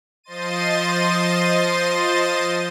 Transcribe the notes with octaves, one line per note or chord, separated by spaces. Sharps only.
F3 C5 D#5 C6 A6 D#7